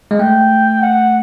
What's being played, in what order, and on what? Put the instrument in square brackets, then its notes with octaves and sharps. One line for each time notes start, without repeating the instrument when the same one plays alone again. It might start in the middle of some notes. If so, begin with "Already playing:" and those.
[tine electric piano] G#3
[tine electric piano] A3 [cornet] G5
[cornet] F#5